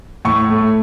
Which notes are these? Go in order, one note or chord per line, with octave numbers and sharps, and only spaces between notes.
A2 C#6
A3